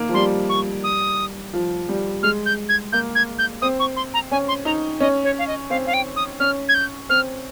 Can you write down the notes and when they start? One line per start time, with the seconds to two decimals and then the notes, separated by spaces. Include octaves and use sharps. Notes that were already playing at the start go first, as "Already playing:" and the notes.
Already playing: A#3 D#4
0.09 F3
0.14 G3 C6
0.49 C#6
0.84 D#6
1.53 F3
1.89 G3
2.23 G#3 F6
2.46 G6
2.69 G#6
2.92 A#3 G6
3.15 G#6
3.38 G6
3.62 C4 D#6
3.79 C#6
3.96 C6
4.14 A#5
4.31 C#4 G#5
4.48 C6
4.65 D#4 A#5
5.00 C#4 D#5
5.24 C#5
5.39 F5
5.47 D#5
5.70 C4 F5
5.86 F5
5.94 G5
6.16 D#6
6.40 C#4 F6
6.69 G#6
6.74 G6
7.09 C4 F6